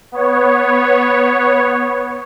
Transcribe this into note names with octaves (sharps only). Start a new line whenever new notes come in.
B3 C#5